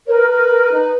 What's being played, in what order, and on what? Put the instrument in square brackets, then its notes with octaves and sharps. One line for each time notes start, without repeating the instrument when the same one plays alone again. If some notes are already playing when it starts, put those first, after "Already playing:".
[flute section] A#4 [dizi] C#5
[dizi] B4
[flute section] A#4
A#4
D#4